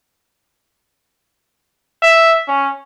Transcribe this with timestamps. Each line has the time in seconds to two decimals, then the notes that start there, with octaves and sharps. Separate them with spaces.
2.02 E5
2.48 C#4